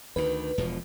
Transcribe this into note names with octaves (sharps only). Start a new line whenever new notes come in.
D2 D#3 B4
E1 B2 F3